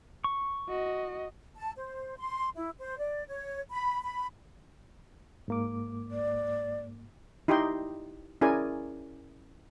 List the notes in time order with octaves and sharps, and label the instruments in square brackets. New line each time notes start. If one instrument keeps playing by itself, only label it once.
[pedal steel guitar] C#6
[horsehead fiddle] F#4 D#5
[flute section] A5
C5
C6
E4
C5
D5
C#5
B5
B5
[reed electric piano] G#2 A#3 D6
[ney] D5
[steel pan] D#4 E4 G4 D#5 G5 C6
C#4 E4 G#4 A#4 D5 G#5